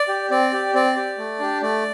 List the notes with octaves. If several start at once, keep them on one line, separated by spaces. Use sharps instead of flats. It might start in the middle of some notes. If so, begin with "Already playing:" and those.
Already playing: D5
G4
C4 D5
G4
C4 D5
G4
A3
D4 G4
A3 D5